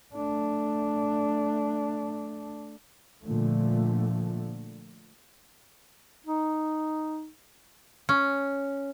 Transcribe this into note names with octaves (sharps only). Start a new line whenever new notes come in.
A3 D4
A#2 D3 F3 A3
D#4
C#4